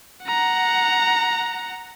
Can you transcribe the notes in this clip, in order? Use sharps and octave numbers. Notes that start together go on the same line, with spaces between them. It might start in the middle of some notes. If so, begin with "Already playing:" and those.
F#5 A#5